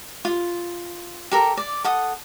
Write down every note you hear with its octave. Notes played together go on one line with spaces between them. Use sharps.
F4
G4 A4 A#4
D5
A4 F#5 D#6